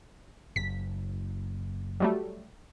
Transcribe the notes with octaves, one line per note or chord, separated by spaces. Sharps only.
F#1 B6
F#3 G3 A3